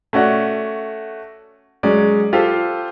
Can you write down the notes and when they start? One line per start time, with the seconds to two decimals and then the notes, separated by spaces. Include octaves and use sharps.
0.13 A3 C#4 F#4 D5 F#5
1.83 F#3 G#3 C#4 D5
2.33 F4 G4 A4 C5